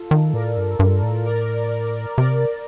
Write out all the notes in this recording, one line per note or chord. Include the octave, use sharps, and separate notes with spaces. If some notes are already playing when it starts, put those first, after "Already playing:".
Already playing: F4 A4
D#3
A2 A#4 D5
G2
G2
A2
A#4 D5
C3 A#4 D5